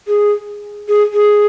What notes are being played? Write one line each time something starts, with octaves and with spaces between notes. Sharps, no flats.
G#4
G#4
G#4